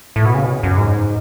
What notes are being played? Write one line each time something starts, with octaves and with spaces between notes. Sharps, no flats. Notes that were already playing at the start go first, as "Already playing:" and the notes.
A2
B2
C#3
B2
F#2
G#2